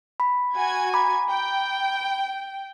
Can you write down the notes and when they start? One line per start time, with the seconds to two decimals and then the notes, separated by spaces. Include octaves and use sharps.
0.20 B5
0.56 F#4 G#5 G#6
0.94 A#5 B5 D6
1.31 G5